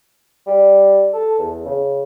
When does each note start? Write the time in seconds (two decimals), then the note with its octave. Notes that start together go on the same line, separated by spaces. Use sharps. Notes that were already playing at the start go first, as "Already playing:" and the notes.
0.47 G3
1.14 A4
1.39 E2
1.66 C#3